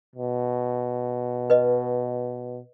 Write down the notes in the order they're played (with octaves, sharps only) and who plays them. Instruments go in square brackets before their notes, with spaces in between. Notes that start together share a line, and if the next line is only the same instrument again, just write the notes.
[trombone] B2
[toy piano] B4 D#5